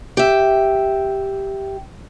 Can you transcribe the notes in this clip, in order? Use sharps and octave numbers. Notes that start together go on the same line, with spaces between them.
G4 E5